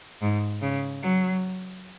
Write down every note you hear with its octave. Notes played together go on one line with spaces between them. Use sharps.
G#2
C#3
F#3